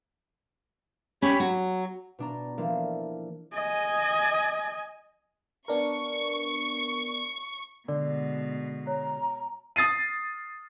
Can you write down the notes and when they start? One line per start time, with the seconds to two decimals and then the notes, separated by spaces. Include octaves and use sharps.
1.22 C#4 G4 C#5 B5
1.40 F#3 F#4
2.19 B2 D4 A#5
2.57 E3 F3 A#3 D4 A4
3.54 D#5 G#5
5.68 B3 D4 A#4 C#6
7.88 B2 D3 G#3 D5
8.87 C#5 A#5
9.76 D#6 A6 C7 D#7